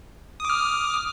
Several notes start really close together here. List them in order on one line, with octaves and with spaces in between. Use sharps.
D#6 D6 F6